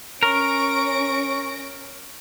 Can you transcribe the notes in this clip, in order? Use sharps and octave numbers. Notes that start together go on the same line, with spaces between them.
C#4 A#4 C#6 A#6 D7